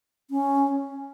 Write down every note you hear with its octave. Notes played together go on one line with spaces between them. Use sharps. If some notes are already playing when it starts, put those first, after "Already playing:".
C#4